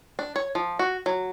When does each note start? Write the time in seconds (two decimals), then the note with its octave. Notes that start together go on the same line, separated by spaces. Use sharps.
0.19 D4
0.36 C#5
0.55 F3
0.79 F#4
1.06 F#3